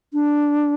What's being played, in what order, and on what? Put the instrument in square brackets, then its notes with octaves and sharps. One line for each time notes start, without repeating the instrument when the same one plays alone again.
[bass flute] D4